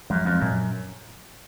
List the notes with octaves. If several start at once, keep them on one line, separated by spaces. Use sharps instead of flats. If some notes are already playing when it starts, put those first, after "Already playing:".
F#2 F3 G#3
F2
F#2 A#2